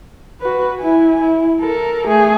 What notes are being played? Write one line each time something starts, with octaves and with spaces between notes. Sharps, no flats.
F#4 B4
E4 G#5
E4
A4 A#4
A3 G#4